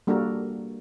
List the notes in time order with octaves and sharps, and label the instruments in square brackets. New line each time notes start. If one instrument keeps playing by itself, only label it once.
[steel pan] G3 A#3 D4 F#4 A4 A#4